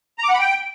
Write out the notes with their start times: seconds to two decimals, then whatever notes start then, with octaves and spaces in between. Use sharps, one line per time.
0.18 A#5
0.24 D6
0.29 F#5
0.34 B5
0.39 G5